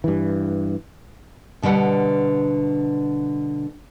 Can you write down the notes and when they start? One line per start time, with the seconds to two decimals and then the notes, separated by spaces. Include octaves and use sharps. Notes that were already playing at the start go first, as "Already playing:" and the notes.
0.04 G2 E3
1.62 B2 D3 G3 B4 F#5